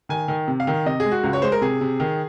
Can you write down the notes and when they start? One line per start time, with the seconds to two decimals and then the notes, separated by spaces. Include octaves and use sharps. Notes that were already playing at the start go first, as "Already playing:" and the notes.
0.09 D#3 G#5
0.28 D#3
0.48 C3
0.60 F5
0.67 D#3
0.86 C3 D#5
1.00 G#4
1.05 G#3
1.11 F#4
1.23 C#2
1.33 C#5
1.42 G#3 C5
1.52 A#4
1.61 C3 G#4
1.81 C3
2.00 D#3